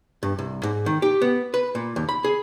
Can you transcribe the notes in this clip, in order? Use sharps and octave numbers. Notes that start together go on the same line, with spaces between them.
G2
C2
G#2
D#3
G4
B3
B4
A#2
D#2
B5
G#4